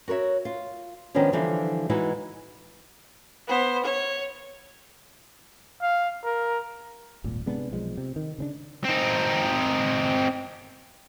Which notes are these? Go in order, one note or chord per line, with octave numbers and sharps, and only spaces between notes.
F#4 A#4 B4 C#5 E5
F4
D#3 F3 G#3 B3 C#4 D4
D3 E3 F3 G3
E3 G#3 D#4 E4 F#4
B3 C5
C#5
F5
A#4
D#1 G#1 A#2
C3 G#3 B3 D4
B1 F3 G#3
C3
D#3
C#3 C4 D4
C4 D#4